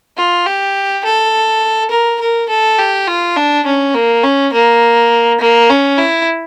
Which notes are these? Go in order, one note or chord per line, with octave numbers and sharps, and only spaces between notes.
F4
G4
A4
A#4
A#4
A4
G4
F4
D4
C#4
A#3
C#4
A#3
A#3
C#4
E4